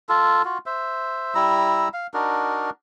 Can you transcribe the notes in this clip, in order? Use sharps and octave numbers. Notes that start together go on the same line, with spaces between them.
F4 A4
F4 F#4
C5 E5
G3 E4 A#5 E6
F5
D4 D#4 F#4 A#4